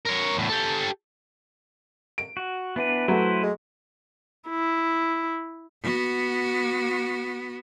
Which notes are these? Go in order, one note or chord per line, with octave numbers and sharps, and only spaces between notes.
A#4 C#5
E2 A2
G4 A4
D7
F#4
E3 B3 D4 B4
F#3 A3 E4 B4 C5
G#3
E4
B3 F#4